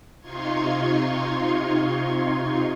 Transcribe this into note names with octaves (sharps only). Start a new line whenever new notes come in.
C3 D#4 F4 C6 C#6 G#6